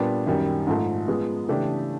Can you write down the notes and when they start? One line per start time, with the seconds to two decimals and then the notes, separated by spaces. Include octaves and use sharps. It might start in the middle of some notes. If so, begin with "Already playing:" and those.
Already playing: A#2 G3 B3 D4
0.27 F#2 D#3 G3
0.67 G#2 F3 A3
1.08 F3 G#3 B3
1.48 C#3 E3 A3 D4 G4